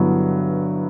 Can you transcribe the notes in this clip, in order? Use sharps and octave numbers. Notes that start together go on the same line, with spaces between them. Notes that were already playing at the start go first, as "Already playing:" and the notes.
Already playing: G2 D3 F#3 B3 E4